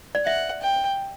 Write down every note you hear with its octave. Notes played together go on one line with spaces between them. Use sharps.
D5
E5 F#5
G5